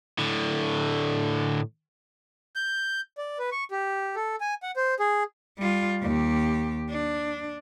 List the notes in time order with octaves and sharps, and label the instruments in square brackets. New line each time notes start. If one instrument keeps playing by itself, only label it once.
[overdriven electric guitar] A2 D3
[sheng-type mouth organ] G6
D5
B4
C#6
G4
A4
G#5
F#5
C5
G#4
[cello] G3 F4
D#2 G4
D4